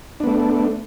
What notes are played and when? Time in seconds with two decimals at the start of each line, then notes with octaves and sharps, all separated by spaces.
0.20 D4
0.24 B3
0.27 A3